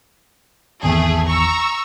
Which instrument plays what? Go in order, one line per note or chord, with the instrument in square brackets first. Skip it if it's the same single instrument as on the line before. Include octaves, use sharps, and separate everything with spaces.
[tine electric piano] G#1 E2 [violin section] A3 G#4
[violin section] A#5 C#6 E6